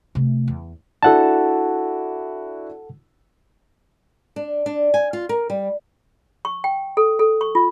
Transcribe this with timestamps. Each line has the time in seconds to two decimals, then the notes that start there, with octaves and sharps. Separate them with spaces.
0.15 C3 A3
0.48 E2
1.03 D4 E4 F#4 A4 F#5 A5
4.36 D4
4.66 D4
4.94 G#5
5.13 F4
5.29 A#4
5.50 G3
6.45 C#6
6.64 G5
6.97 A4
7.19 A4
7.41 C#6
7.55 F4